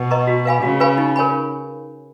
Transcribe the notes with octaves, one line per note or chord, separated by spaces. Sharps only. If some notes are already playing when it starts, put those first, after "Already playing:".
Already playing: B2
B4 D#5 A#5 C#6
F#4
B4 F5 G#5 B5
C#3 F#4
B4 F5 G#5 B5
D#4
A#4 C#5 G#5 B5